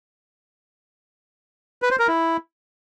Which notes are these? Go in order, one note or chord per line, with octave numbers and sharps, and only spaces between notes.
B4
C5
A#4
E4